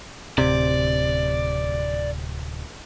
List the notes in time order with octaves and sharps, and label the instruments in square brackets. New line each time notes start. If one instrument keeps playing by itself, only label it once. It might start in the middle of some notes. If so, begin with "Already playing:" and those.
[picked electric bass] D1 C3 [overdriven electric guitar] D5